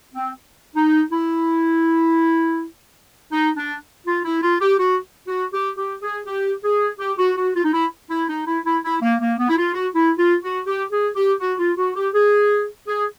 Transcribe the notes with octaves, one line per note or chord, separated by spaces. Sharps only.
C4
D#4
E4
D#4
D4
F4
E4
F4
G4
F#4
F#4
G4
G4
G#4
G4
G#4
G4
F#4
F#4
F4
D#4
E4
E4
D#4
E4
E4
E4
A#3
A#3
B3
E4
F4
F#4
E4
F4
F#4
G4
G#4
G4
F#4
F4
F#4
G4
G#4
G#4